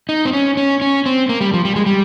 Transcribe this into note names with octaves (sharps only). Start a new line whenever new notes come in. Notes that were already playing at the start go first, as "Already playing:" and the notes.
D#4
C4
C#4
C#4
C#4
C4
A#3
G3
F3
G3
G#3
G3